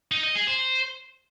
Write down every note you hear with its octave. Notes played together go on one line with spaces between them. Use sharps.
D#4
D#5
G#4
C5